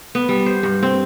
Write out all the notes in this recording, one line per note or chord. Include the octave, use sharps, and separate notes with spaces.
B3
G3
C5
G2
C4